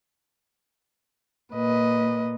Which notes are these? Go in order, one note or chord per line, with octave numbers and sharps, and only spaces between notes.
A#2 B4 D#5